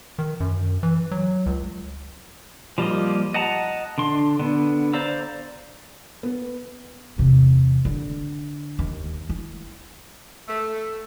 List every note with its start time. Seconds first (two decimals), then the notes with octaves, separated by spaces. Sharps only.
0.19 D#3
0.40 F#2
0.83 E3
1.11 F#3
1.46 C#2
2.78 F3 G3 A#3 F4 D#5
3.34 D#5 F#5 A5 A#5
3.98 D3 D4 C6
4.40 D3 B3
4.94 C5 D5 F5 A#5 E6
6.23 B3
7.18 E2 C3
7.85 D3
8.79 D#2
9.29 E4
10.48 A3